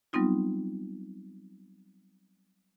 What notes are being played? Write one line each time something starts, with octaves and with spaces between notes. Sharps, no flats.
F#3 G3 B3 C4 D#4 F4